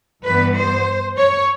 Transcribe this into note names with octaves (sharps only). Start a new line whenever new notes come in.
G2 E3 G3 B3 B4
C5
C#5